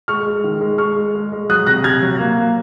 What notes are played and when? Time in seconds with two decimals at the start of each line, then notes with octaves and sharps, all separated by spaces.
0.08 G#3 C#6 F6
0.27 G#3
0.44 D#3
0.61 G#3
0.78 G#3 C#6 F6
0.96 G#3
1.15 G#3
1.32 G#3
1.49 F#3 D#6 F#6
1.66 C3 F#6 A#6
1.84 C3 F6 G#6
2.02 F#3
2.19 A#3
2.37 A#3